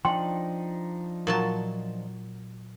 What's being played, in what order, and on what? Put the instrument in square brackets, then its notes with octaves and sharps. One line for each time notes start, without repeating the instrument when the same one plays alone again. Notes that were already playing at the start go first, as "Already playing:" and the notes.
[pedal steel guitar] F3 D4 D#4 [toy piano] G5 C6
[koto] A#2 F#3 A5